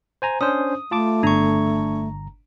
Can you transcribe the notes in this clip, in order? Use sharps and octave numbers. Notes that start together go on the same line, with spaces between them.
C5 G#5 A#5
C#4 D4 C5 D#6
A3 F4 A5 D6
G1 D4 A#5 C#6